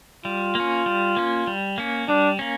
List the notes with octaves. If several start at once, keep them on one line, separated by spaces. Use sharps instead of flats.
G3 F4
A#3 C#4
G3
A#3 C#4
G3
A#3 C#4
G3 D4
A#3 C#4